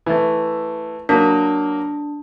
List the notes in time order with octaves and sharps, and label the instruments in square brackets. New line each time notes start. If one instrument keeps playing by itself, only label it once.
[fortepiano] E3 A3
[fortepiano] F#3 A#3 [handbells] D4